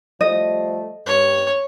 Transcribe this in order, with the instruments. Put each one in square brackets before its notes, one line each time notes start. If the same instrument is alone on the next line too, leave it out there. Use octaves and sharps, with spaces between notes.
[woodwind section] F3 G3 A3 [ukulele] D#5
[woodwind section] G2 [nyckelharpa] C#5